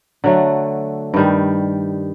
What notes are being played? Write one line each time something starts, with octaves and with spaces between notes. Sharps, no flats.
D3 F#3 A3
G2 D#3 G3